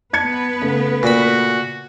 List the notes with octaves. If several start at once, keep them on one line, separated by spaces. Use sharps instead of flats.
B3 B4 A5 G#6 C#7
C#3 A3
A#2 F#4 B5